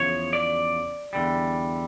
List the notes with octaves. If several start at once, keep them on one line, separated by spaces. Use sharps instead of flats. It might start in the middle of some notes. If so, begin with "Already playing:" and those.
Already playing: E2 C#3 F3 C#5
D5
E2 D3 G3